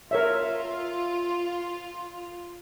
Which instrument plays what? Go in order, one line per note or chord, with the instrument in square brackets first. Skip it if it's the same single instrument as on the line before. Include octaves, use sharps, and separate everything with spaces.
[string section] F4 [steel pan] A#4 C#5 E5